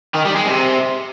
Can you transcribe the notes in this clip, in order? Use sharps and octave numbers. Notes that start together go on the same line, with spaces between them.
D#3
G3
G#3
C3